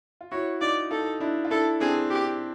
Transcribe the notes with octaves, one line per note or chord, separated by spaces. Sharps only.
F4
E4 F#4 C#5
D#4 F4 D5
D#4 F4 A4
D4 E4
F4
D4 E4 A4
C4 D4 G#4
G4